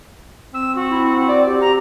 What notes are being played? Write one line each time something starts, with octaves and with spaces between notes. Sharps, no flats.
C4 E6
F#4
E4
D5
G4
A#5